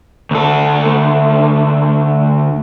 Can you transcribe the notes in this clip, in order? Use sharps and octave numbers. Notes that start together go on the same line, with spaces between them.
D2 A4